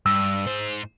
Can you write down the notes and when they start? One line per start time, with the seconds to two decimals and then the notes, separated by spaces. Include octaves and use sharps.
0.06 G2 E6
0.47 G#2 C5